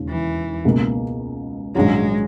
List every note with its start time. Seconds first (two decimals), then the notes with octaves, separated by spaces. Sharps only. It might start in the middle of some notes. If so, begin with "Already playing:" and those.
Already playing: E1 D#2 C#3
0.09 E3
0.65 C#2 B2 A#3
1.75 A#1 G#2 D#3 F#3 G#3 C#4